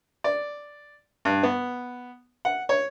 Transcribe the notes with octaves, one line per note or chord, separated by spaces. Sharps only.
D5
G2
B3
F#5
C#5